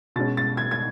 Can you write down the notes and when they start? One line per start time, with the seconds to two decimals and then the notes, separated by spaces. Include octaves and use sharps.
0.16 B2 G#3 C#4 A6
0.37 A6
0.57 G#6
0.71 G#6